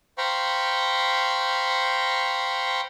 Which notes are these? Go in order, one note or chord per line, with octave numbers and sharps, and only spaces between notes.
C5 F5 G5 A#5 B5 C#6